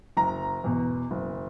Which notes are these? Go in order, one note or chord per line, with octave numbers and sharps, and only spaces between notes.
F#1 A#5
E2 B2
F#1